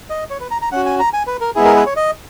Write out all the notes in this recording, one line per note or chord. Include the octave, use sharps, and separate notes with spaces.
D#5
C#5
B4
A#5
A#5
C#4 F#4 F#5
G#5
A#5
G#5
B4
A#4
G#3 B3 E4 G#4
A#4
B4
C#5
D#5